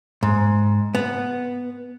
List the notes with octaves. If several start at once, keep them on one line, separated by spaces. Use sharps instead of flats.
G#2
B3